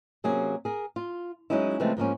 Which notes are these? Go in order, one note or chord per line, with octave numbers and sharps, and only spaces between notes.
C3 F#3 A#3 C#4 G#4
G#4 A#4
F4
F#3 G#3 C#4 D#4 E4
C#3 E3 F3 G#3 A3 C4
G#2 F3 A#3 C#4